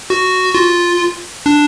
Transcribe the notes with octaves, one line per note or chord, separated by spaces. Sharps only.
F#4
F4
D4